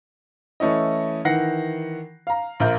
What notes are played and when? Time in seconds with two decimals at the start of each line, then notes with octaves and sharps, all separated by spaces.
0.60 E3 A3 C#4 E4 D#5
1.25 D#3 E3 F#5 A#6 C7
2.27 F5 A#5
2.60 A#1 F4 A#4 G6